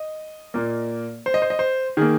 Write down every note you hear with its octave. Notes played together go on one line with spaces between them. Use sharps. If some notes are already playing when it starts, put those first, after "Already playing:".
Already playing: D#5
A#2 A#3
C5
D#5
C5
D#5
C5
D#3 A#3 G#4